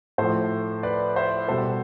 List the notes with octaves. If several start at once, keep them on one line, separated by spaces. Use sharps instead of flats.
A2 F3 A4 C5
B4 D5
C5 E5
B2 G3 A4 C5